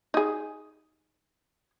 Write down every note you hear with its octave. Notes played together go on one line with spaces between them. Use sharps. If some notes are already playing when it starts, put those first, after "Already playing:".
D#4 G#4